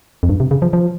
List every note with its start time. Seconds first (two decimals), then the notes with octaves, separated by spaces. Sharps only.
0.23 F2
0.29 G2
0.40 C3
0.51 C#3
0.62 F3
0.73 F3